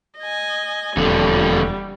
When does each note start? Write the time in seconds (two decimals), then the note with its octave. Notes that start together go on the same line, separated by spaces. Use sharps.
0.19 D#5 G#5
0.97 E1 F2 D3 G3